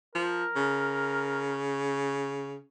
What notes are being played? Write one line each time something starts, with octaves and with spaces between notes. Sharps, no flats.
F3 A#4
C#3